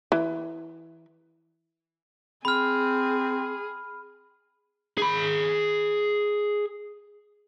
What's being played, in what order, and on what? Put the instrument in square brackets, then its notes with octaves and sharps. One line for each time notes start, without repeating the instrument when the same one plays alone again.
[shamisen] E3
[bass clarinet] C4 [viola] G#4 [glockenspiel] B5 F6
[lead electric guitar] G#4 B5